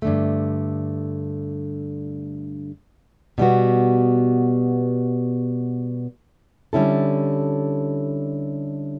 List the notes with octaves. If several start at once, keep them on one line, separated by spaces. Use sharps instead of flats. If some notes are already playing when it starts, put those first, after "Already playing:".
G2 D3 A3
B2 G3 B3 F#4
D3 G3 C#4 E4 A4